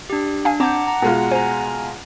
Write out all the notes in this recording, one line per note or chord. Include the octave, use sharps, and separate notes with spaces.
D4 G4
D4 F5 G#5
C4 F#5 A5 A#5 D6 G6
A#5
B2 G#3 F4
C5 G#5 A#5